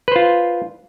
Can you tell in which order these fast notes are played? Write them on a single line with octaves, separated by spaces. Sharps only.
B4 C5 F4